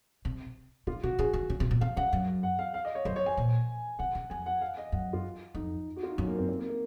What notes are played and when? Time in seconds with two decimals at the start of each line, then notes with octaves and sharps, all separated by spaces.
0.25 C3
0.87 C#3 F4
1.03 C3 F#4
1.19 C#3 G#4
1.33 D#3
1.50 C#3
1.60 C3
1.71 A#2
1.81 C3 F5
1.97 C#3 F#5
2.13 F#2
2.43 F#5
2.59 F5
2.74 F5
2.85 D#5
2.95 C#5
3.05 F#2 C5
3.16 C#5
3.26 G#5
3.37 A#2
3.99 C3 F#5
4.15 C#3
4.30 F2 G#5
4.46 F#5
4.61 F5
4.77 D#5
4.92 F#2 F#5
5.13 F4
5.55 F2 D#4
5.96 F#4
6.03 F4
6.11 D#4
6.18 F#2 C#4
6.28 A#3
6.38 C4
6.49 C4
6.59 A#3
6.69 A#3